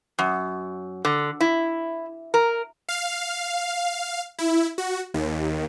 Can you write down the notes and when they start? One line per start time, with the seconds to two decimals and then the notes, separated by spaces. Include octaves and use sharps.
0.19 F#2
1.05 D3
1.41 E4
2.34 A#4
2.89 F5
4.39 E4
4.78 F#4
5.14 D#2